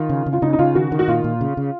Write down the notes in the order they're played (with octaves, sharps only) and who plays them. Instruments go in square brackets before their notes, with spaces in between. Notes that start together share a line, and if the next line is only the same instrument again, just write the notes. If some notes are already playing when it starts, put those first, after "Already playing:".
Already playing: [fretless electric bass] D#3 [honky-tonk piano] F4
[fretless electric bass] C#3
C#3
[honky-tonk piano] F4
[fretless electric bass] C#3 [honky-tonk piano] D#4
[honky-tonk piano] D#4
[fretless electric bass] C#3 [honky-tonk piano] F4
[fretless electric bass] D#3 [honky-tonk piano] F#4
[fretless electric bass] D#3
[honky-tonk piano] F#4
[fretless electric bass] A#2 [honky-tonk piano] F4
[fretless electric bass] A#2
C#3
C#3